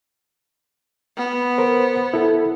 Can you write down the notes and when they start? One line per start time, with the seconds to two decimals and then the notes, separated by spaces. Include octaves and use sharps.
1.17 B3
1.58 A#4 C5
2.14 E4 A4